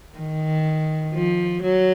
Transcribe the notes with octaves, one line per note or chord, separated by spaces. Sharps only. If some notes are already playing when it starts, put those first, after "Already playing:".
D#3
F3
F#3